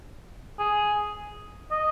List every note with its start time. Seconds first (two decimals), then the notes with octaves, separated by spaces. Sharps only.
0.60 G#4
1.72 D#5